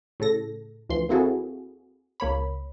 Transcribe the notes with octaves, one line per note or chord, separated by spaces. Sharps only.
A2 C#3 A4 A#6
D2 E3 F3 C6
A#3 C4 E4 F#4 G#4 A4
C#2 A#3 C#5 B5